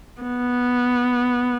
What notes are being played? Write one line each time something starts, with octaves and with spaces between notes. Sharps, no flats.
B3